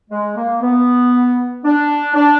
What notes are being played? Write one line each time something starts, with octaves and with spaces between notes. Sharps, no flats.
G#3
A#3
B3
D4
D4